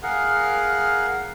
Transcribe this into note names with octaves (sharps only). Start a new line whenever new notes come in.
G#4 A#4 F5 F#5